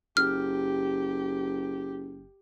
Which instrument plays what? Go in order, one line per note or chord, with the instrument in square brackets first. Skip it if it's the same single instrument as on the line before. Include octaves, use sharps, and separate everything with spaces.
[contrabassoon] F#1 [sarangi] G4 [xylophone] F6